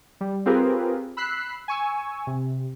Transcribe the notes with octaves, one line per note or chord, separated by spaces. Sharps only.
G3
C4 F4 G4 G#4 A#4 B4
B5 E6 F#6 B6 C7
G#5 C#6 E6
C3